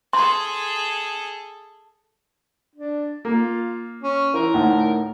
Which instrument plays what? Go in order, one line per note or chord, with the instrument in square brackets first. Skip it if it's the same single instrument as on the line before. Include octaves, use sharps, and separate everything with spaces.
[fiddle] G#4 A4 [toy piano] C6
[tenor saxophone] D4
[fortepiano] A#3 [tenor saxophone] F4
[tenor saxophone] C#4
[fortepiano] E3 C5 [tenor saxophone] A#4
[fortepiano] D2 A2 D#3